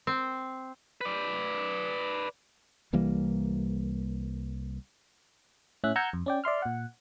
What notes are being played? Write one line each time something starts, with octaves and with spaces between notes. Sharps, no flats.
C4
B4 D5
C2 E3 G3 A#3
A2 C#4 E5 F#6
F#5 A#5 E6 G6 G#6 C#7
F2
C#4 D5 G5
D5 E5 C6 F6
A#2 F#5